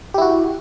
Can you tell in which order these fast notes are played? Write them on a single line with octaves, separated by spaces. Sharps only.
G4 E4 F#4